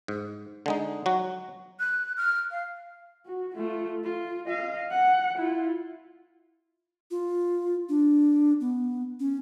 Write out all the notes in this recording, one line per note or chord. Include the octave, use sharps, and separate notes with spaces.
G#2
D3 G#3 D#4
F#3 F#4
F#6
F6
F5
F#4
A3 F4
F4
D#5 F5
F#5
E4 F4
F4
D4
B3
C#4